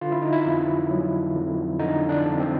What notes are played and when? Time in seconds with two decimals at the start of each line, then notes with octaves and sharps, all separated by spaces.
0.01 D3 F4
0.12 E4
0.22 D#4
0.32 E4
0.46 F2
0.91 F#3
1.35 F2
1.80 D3 D#4
2.09 D4
2.24 F2
2.39 C4